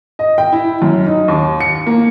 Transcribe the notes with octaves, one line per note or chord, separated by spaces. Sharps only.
D#5
G5
E4
F#2
D#4
D#2
C#7
A#3